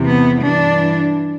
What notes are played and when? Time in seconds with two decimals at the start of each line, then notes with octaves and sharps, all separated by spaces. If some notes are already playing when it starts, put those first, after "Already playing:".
Already playing: E2 C3 E3
0.09 B3
0.45 G2 E3 D4